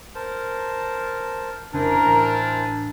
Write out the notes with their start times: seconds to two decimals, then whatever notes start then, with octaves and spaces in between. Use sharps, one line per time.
0.15 A#4 C5 A5
1.74 F1 C#3 D4 E4 A#4 C5 G#5 A#5
2.07 A1